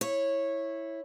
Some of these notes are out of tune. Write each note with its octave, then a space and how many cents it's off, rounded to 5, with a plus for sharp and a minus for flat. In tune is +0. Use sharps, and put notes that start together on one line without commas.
E4 +0 C#5 -10